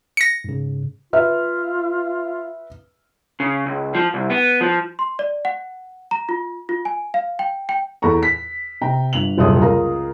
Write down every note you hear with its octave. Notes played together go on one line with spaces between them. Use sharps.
A#6 C#7
G#2 C#3
F4 B4 E5 F6
C#3
C#2
F3
C2
B3
F3
C6
D5
F#5
A#5
F4
F4
G#5
F5
G5
G5
E2 A4 A#5 C#6
B6
C3 G5 A#5
G1 F7 F#7
D#1 C#2 F#2 C3 D#6
C#2 A#4 F5 A#5